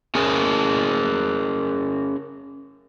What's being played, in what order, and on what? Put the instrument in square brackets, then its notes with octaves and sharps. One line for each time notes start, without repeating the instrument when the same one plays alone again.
[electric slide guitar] C#4 G#4 A#4